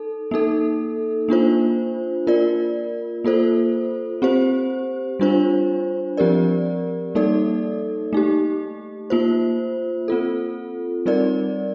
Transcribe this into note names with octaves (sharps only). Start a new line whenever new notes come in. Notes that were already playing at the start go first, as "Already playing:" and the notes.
Already playing: D#4 A4
A#3 D#4 A4
A#3 D4 F4 C5
A#3 F4 A#4 D5
A#3 F4 A4 C5
C4 G4 C5
G3 D4 F4 C5
F3 C4 G4 A#4 D5
G3 A#3 D#4 A4 D5
A3 D#4 G4
A#3 F4 C5
C4 F4 A4
G3 C4 D#4 A#4 D5